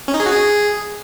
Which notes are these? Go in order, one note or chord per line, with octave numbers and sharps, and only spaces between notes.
C#4
D#4
G#4
F#4
G#4